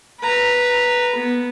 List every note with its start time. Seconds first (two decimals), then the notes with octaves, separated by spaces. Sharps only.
0.20 B4 A#5
1.15 B3